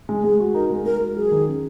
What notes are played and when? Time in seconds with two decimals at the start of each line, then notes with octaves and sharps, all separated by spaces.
0.09 G#3
0.24 G#3 G#4
0.40 F#4
0.54 D#4 A#4
0.70 G#3
0.86 G#3 A#4
1.01 F#4
1.16 F#3 G#4
1.32 D#3
1.47 C#4